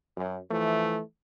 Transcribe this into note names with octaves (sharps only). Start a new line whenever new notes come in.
F#2
E3 F3 A3